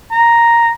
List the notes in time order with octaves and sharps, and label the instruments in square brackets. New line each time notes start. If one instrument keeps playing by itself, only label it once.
[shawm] A#5